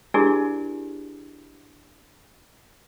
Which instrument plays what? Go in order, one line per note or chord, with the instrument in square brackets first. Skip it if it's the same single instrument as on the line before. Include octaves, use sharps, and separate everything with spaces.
[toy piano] D4 E4 G4 G#4 A#4 D5